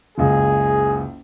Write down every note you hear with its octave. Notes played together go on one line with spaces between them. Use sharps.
F#1 C#2 G#4